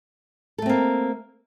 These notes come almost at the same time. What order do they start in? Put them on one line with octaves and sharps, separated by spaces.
A4 A3 C4 A#3